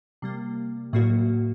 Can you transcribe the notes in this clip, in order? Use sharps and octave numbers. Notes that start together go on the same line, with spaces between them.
C3 G3 A#3
A2 F#3 A#3 F#4